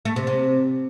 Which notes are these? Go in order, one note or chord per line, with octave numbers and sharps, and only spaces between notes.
A3
C3
C3